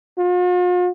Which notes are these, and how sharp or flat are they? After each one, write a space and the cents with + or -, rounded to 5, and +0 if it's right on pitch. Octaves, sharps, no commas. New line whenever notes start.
F4 +45